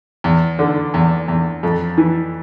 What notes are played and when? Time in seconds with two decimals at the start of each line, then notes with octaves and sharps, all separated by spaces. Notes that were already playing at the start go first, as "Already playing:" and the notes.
0.24 E2
0.59 D3
0.94 E2
1.28 E2
1.63 F2
1.98 E3